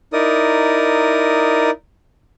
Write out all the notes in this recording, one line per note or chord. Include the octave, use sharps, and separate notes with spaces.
D#4 E4 A#4 D5 D#6